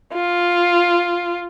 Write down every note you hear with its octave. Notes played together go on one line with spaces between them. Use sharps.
F4